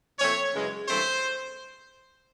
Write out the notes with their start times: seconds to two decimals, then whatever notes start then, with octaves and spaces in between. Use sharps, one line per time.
0.19 A#2 F3 A3 C4 C#5
0.53 F#2 C#3 E3 G#3
0.87 G2 E3 A3 C4 C5